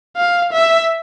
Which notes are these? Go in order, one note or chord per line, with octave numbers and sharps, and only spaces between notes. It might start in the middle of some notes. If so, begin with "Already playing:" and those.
F5
E5